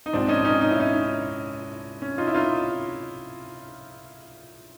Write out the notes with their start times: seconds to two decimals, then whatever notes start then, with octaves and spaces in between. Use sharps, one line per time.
0.06 D#4
0.13 A#1 G#2 F3 C4 D4
0.28 C#4 D#4
0.44 C#4 D#4
0.61 D#4
0.71 E4
0.80 C#4 D#4
2.02 C#4
2.18 D#4 F4
2.27 E4
2.34 D#4 F4